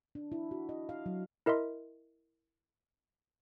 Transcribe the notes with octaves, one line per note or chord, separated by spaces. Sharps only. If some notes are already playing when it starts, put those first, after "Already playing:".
D4
E4
F#4
D#5
F5
F#3
E4 A#4 D#5 E5 C6